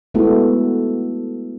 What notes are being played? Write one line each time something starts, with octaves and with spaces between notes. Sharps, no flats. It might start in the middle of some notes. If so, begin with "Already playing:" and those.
G#3 A3 B3 E4 F#4 A4